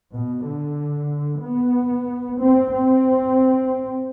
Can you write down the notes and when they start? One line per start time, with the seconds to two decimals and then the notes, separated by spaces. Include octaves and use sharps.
0.13 B2
0.46 D3
1.42 B3
2.39 C4
2.72 C4